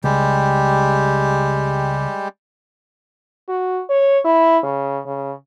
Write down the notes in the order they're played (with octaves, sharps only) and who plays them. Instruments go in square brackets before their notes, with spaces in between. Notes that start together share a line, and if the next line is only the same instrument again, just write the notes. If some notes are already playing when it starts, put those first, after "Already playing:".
[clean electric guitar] C#2 [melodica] G3 G#3 G4
[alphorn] F#4
C#5
E4
C#3
C#3